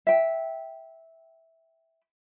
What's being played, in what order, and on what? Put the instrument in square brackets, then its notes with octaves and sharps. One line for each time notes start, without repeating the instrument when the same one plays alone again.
[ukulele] E5 G5